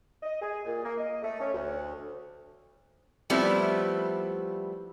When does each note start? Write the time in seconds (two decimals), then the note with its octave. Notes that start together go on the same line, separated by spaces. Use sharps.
0.23 D#5
0.41 G#4
0.65 A#2
0.83 A#3
0.97 D#5
1.22 A3
1.40 C#4
1.53 D2
3.30 F3 G3 A3 B3 C4 E4